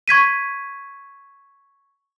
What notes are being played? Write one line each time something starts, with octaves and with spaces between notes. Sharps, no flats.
C#6 G#6 B6 D#7